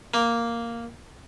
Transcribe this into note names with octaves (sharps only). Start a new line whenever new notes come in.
A#3